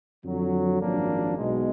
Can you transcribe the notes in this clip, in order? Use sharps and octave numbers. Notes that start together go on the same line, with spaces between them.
F2 D3 F#3
G#1 F#2 F3 A#3 D4
B1 B2 G#3